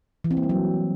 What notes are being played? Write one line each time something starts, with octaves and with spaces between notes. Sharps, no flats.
E3
C4
A#3
G3
F#3